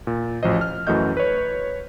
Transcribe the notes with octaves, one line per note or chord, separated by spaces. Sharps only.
A#2
A1 F3 F#4 C5 D#5
F6
F#2 E3 A3 F#4 D#5 G6
B4 C#5